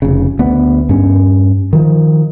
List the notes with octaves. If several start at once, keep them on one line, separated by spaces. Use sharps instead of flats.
F1 C#3
D2 B3
G2 C#4
D#3 F3